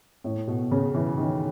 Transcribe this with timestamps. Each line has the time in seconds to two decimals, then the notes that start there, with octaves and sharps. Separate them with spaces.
0.24 A2
0.47 B2
0.72 C#3
0.95 E3
1.18 D#3